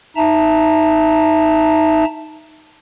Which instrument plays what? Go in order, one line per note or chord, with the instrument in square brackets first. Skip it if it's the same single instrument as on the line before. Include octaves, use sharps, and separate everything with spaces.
[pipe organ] D#4 E5 A5 A#5